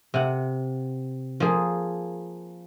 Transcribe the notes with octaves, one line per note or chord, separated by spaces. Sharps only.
C3 F#5
F3 A#3 G#4